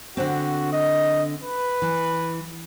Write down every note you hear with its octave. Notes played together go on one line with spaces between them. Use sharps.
D3 C4 F#4
D#5
B4
E3